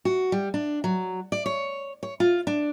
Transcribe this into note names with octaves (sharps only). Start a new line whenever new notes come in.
F#4
G3
D4
F#3
D5
C#5
C#5
F4
D4